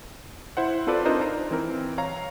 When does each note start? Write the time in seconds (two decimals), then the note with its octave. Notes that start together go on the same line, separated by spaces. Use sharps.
0.57 E4 C5 F#5
0.87 C4 F4 A4 B4 D5
1.05 D4 D#4 F4 A#4 C5 D#5
1.21 A#5
1.51 E3 C4 A#4
1.98 C#5 F5 A#5